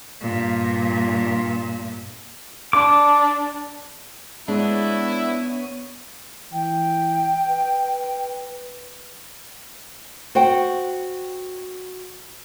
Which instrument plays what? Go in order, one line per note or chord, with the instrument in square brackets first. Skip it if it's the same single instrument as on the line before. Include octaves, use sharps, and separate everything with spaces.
[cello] G2 A#2
[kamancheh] D4 [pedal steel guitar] D6
[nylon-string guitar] G#3 [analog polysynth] B3 C#5 D#7 [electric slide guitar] D4 [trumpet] E4
[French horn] E3 [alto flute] G5
[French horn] B4
[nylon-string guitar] F#4 C5 F#5 G5